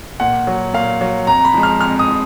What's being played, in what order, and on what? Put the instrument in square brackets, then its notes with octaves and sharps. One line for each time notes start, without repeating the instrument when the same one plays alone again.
[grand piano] A#2 F#5
F#3
A#2 F5
F#3
F2 A#5
B5
F3 G#3
F6
F2 F6
D#6
F3